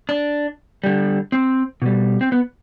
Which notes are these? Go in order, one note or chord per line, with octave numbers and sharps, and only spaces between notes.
D4
D3 G3
C4
B2 G3
C4
B3